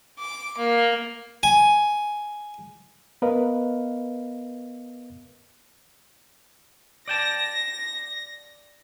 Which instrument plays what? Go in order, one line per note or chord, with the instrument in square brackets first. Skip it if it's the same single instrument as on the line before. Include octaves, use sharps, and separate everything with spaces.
[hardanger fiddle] D6
A#3
[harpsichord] G#5
[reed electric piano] B3 A#4 B4 D#5 F5
[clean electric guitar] D5 G5 A5 [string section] A#6